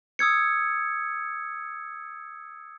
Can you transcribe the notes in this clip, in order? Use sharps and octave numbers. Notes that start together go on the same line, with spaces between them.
D#6 E6 G#6 C#7